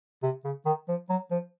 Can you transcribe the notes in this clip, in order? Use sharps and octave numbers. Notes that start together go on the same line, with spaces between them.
C3
C#3
D#3
F3
F#3
F3